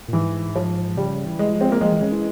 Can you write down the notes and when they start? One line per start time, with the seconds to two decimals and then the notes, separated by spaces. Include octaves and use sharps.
0.08 A#2
0.13 G#2 E3
0.56 F3
0.97 C#3 G3
1.25 E3
1.39 G#3
1.53 F3
1.61 C4
1.72 A#3
1.81 F3 G#3
1.92 E3
2.02 C#3
2.12 E3